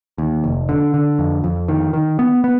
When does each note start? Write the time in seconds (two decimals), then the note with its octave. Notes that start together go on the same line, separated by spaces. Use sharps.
0.18 D#2
0.44 F1
0.69 D3
0.94 D3
1.19 F2
1.44 F2
1.68 D#3
1.93 D#3
2.19 B3
2.44 B3